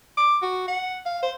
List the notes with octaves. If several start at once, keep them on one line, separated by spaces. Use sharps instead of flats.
D6
F#4
F#5
F5
C5